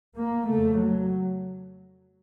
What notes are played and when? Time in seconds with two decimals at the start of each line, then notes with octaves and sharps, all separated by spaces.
0.17 A#3
0.48 F2 C#3 A3
0.79 F#3